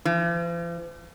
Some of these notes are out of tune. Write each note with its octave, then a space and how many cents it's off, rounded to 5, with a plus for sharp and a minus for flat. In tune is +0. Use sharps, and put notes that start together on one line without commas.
F3 -45